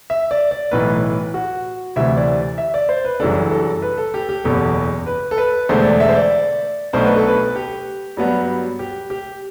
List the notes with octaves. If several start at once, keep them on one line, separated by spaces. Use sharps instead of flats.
E5
D5
D5
B1 A2 E3 B4
F#4
D2 C3 E3 E5
D5
E5
D5
C5
B4
F#1 F#2 E3 G3 D4 A4
A4
B4
A4
G4
G4
F#1 E2 B2 A4
B4
A4
B4
E1 E2 D3 A3 C5
D5
E5
C5
D5
B1 B2 A3 D4 C5
B4
A4
B4
G4
G2 F#3 B3 D4
G4
G4